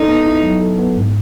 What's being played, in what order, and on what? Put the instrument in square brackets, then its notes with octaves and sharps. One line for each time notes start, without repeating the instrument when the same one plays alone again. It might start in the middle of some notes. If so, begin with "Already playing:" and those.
Already playing: [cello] D#4 [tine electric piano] A4
[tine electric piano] B3
E4
F#3
A4
B3
G#2